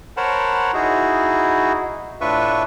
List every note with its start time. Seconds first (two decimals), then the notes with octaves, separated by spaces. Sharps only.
0.17 A#4 C5 C#5 F#5 A5 B5
0.74 D#4 E4 F#4 G#4
2.21 A2 D4 F4 B4 E5 C#6